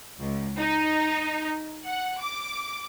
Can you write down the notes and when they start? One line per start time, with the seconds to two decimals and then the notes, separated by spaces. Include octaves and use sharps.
0.19 C#2
0.58 D#4
1.85 F#5
2.21 D6